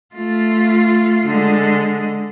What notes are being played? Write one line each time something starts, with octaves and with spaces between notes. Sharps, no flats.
A3 F4
D3 G#3